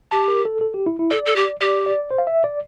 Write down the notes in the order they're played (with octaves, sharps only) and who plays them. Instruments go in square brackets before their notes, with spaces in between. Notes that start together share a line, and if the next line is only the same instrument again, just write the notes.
[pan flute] G4 [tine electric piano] A5
[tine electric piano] A#4
A4
A4
G4
E4
E4
[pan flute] A4 [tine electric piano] D5
[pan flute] A4
G4
[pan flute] G4 [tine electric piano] D5
[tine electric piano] D5
C5
F5
E5
D5